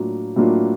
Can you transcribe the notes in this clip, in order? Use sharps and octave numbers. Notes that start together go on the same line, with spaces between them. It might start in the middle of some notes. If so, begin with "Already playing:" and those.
Already playing: A2 F#3 A#3 D4 F4
A2 F#3 A#3 D4 F4